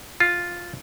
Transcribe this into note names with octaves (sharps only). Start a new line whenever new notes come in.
F4